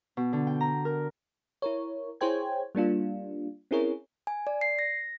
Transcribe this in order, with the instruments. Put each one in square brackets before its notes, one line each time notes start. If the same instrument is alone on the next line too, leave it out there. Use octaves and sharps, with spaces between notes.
[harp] B2
D3
G5
A#5
A#4
[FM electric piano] E4 A#4 C#5
E4 G#4 C5 C#5 G5 G#6
G3 A#3 D4 F4
C4 C#4 E4 G#4 A#4 C#5
[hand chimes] G#5
D5
C7
A#6